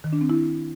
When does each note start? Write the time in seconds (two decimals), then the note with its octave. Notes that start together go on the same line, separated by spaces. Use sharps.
0.04 D#3
0.13 D4
0.21 C4
0.30 E4